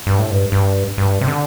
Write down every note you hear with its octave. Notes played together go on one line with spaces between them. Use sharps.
G2
A2
G2
G2
G2
C3
D3